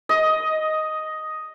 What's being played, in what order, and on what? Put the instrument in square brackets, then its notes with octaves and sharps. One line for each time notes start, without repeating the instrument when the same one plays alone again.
[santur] D#5